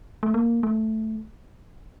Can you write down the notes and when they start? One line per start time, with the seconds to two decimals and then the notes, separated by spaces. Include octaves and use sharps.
0.23 A3
0.34 A#3
0.63 A3